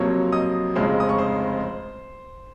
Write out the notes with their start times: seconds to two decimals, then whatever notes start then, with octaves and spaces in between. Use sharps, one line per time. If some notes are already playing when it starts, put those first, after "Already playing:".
Already playing: F2 C3 F#3 A#3 C#5 C#6
0.32 D#5 D#6
0.75 F1 F2 C#3 G#3 C5 C6
1.00 D#6
1.09 C#6
1.18 C5 C6